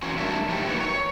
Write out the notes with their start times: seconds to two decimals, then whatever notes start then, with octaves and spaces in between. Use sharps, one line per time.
0.02 E3 F#3 A#3 C4 C#4 F#4
0.18 G3 A3 A#3 D4 E5
0.48 F3 A3 D#4 G4 G5
0.68 F#3 A#3 B3 C#5
0.80 C#5